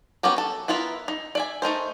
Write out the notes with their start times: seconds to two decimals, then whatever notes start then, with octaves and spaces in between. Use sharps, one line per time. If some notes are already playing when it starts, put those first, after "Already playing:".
0.23 B3 C#4 F#4 G4 A#4
0.38 A4
0.68 B3 E4 F4 A#4 E5
1.08 D#4
1.35 D5 E5 G#5
1.62 A3 D#4 A#4 C5